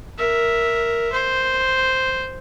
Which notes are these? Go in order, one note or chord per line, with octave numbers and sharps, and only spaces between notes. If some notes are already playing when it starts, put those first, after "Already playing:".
A#4 E5
C5